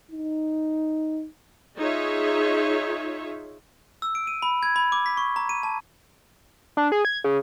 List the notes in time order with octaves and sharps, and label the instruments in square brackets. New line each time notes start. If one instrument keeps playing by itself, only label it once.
[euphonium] D#4
[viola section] D#4 F4 G#4 C#5 E5
[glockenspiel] E6
D7
D#7
B5
G#6
B5
D6
B6
C#6
A#5
D#7
A5
[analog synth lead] D4
G#4
G#6
C#3